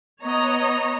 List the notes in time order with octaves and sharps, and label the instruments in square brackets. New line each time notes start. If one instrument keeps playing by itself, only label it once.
[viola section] B3 C#5 D#5 A#5